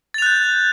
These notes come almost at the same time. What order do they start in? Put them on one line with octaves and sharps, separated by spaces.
A6 F7 F#6 G6